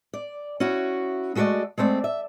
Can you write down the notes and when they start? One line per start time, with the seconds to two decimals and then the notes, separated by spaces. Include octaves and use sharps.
0.13 D5
0.60 C#4 E4 F#4
1.35 G#3 A3 F#4 B4 D5 D#5
1.78 G#3 A3 C4 D5
2.04 E5